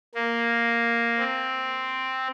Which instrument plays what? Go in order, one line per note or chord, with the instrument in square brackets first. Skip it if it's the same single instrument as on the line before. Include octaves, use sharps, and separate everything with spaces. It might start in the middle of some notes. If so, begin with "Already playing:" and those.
[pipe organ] A#3
C4